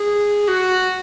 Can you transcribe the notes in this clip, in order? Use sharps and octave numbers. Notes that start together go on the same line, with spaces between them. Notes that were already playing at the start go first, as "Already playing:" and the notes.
Already playing: G#4
F#4